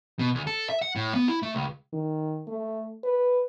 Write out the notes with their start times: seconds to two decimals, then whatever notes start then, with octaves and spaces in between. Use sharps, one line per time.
0.19 B2
0.35 D2
0.47 A4
0.70 E5
0.82 F#5
0.96 A2
1.15 B3
1.28 E4
1.43 A3
1.55 C#2
1.93 D#3
2.48 A3
3.04 B4